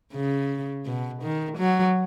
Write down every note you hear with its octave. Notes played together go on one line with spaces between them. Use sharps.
C#3
B2
D#3
F#3